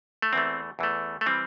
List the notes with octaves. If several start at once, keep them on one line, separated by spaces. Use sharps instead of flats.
A3
E2 E3 A3 C4
E2 E3 A3
A3
E3 G3 C4